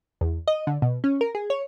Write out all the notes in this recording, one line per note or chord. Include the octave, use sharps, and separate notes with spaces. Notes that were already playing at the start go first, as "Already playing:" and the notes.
E2
D#5
D3
B2
C#4
A#4
G#4
C#5